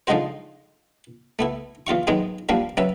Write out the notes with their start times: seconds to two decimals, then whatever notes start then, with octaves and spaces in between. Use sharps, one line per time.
0.07 D3 F3 G#3 D#4 F#4 C5
1.39 A3 B3 E4
1.87 E2 F4 F5 C#6
2.07 G#2 D#3 F#3 G#3 B3 C4
2.49 F3 G3 A#3 D4 F#4
2.77 F#3 C#4 B4 E5